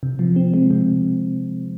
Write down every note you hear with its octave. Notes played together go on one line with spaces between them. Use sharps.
C3
F3
C4
G#3
C3